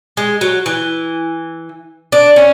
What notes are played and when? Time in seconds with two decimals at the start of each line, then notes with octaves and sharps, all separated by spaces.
0.17 G#3
0.41 F#3
0.66 E3
2.12 D4
2.36 C#4